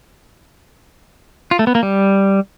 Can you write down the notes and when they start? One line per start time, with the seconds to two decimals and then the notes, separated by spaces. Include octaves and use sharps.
1.51 F4
1.59 A3
1.67 B3
1.75 A#3
1.83 G3